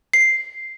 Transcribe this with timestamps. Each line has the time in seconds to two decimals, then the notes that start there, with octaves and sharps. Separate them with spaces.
0.13 C7